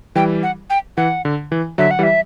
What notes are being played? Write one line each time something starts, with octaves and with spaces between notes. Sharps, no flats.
E3 G3 G5
F#5
G5
E3 F#5
D3
E3
D3 F#3 E5
F#5
E3 G3
E5